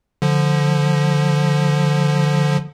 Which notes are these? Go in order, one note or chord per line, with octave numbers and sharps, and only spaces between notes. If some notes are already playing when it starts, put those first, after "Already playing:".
D3 F3